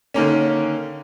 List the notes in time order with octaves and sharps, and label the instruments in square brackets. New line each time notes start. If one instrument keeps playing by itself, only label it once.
[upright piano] D3 D#3 A#3 C#4